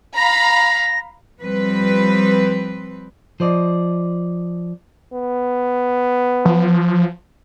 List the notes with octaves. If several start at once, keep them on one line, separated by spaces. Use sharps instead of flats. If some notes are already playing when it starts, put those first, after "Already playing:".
F5 A#5 B5 A#6
F3 G3 C4 B4
F3 C5 D5 D#5
B3
F3